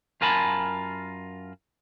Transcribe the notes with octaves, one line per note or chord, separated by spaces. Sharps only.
F#2 F4 A#4 G#5 A5 B5